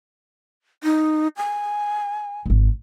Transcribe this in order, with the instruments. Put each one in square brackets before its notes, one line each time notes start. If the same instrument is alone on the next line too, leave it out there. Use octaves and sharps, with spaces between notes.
[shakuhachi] D#4
G#5
[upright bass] D1 G#1